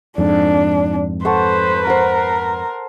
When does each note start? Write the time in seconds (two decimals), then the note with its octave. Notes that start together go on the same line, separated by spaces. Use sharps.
0.18 F2 G#2 D4
1.25 A4 B4 C5 F#5 C#6
1.87 A#4 C5 F#5